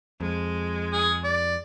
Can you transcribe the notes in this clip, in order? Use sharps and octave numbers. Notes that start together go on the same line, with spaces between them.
F2 G#3
G#4
D5